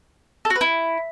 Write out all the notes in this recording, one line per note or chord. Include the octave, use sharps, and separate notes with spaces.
A4
F#4
B4
E4